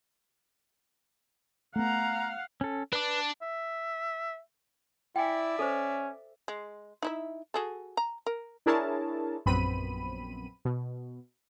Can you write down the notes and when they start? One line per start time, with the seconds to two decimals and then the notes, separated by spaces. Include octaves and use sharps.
1.76 A3 B3 F5 F#5 A#5
2.61 C#4 A4
2.93 D4 B4 D6
3.42 E5
5.16 E4 D5 E5 G5 G#5
5.59 C#4 A4 C5
6.48 G#3
7.02 D#4 E4 E5
7.54 F#4 G#4 A4
7.97 A#5
8.26 A#4
8.66 D4 E4 G#4 A#4 C#5 A5
9.46 A#1 F#2 B3 C4 B5 D#7
10.65 B2